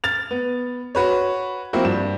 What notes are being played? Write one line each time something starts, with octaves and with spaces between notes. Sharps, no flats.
F6 A6 F7
B3
F#4 B4 C#5
F3 A#3 C4 E4 F#4
G2 E7